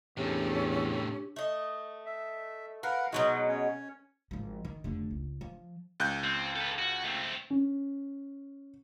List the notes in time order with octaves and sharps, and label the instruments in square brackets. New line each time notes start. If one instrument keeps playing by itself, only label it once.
[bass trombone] E2 [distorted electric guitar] A2 C3 [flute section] C#4 A4 [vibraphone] D4 G4
[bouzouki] A3 D#5
[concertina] E5
[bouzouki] A#4 [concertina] B4 F5 F#5
[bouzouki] B2 F#3 G#3 [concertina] D#4 F#4
[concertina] C#4 C#5
[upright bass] G#1 F3
D#3
F1 D3
C#2
F3
[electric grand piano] C#2 F#6 G6
[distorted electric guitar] C4
A4 B4
F#4
A3 C4
[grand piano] C#4